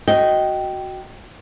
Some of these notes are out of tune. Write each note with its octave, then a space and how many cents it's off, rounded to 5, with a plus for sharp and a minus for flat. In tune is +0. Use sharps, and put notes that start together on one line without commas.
F#4 +0 D#5 +0 G5 -15